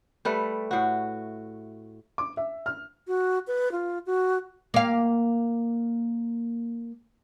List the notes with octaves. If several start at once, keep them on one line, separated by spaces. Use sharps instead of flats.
G3 A3 B4
A2 F#4
D6
E5
F6
F#4
B4
F4
F#4
A#3 F5